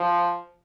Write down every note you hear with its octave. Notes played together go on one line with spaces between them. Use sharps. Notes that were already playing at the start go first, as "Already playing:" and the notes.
Already playing: F3